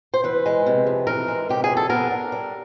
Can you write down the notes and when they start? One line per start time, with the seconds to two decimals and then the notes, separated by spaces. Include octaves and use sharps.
0.14 C5
0.24 E3 B4
0.46 G#3
0.66 C3
0.87 F2
1.07 E3 A#4
1.28 G#3
1.49 C3 G4
1.64 G#4
1.70 F2
1.77 A4
1.90 B3 A#4
2.11 D4
2.32 G3